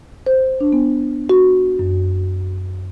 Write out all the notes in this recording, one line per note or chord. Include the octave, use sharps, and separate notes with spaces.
C5
D4
B3
F#4
F#2